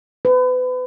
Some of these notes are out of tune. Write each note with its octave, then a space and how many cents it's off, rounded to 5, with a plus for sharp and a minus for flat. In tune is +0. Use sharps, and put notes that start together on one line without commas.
B4 +35